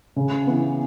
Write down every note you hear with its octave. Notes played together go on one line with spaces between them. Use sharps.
C#3
E3 B3